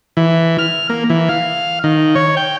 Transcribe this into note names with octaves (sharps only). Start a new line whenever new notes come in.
E3
F6
A#3
E3
F5
D#3
C#5
G5